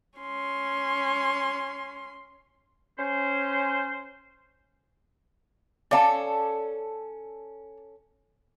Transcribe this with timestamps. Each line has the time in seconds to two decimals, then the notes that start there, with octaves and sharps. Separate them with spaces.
0.19 C#4 C6
2.99 C#4 C5
5.91 C#4 A4 D5 F5 A5